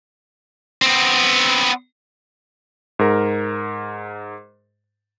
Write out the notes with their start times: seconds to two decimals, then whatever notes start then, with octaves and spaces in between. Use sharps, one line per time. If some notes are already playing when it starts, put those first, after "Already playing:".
0.82 B3 C4
2.99 G#2 A#4